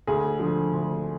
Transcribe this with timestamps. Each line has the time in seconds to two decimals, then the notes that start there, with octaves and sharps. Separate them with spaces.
0.07 D2 G#4
0.39 D3 F3
0.73 D2